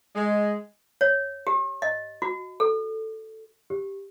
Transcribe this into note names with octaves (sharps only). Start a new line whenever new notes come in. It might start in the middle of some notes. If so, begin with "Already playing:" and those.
G#3
C#5
G4
D#5
F#4
A4
G4